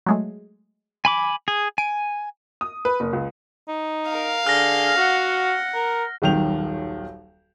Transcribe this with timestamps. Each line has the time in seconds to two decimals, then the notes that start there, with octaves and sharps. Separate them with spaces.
0.06 F#3 G#3 A3
1.05 G#5 B5 D6
1.48 G#4
1.78 G#5 D7
2.61 D#6
2.85 B4
3.00 F#1
3.13 C#2
3.68 D#4
4.11 A#4 F5
4.47 D3 G#4 F6 A#6
4.97 F#4 F#5
5.74 A#4
6.22 D#1 B1 D#3 G6 F7